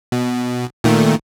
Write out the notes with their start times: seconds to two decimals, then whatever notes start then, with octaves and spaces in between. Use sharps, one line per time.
0.12 B2
0.84 A#2 D#3 A3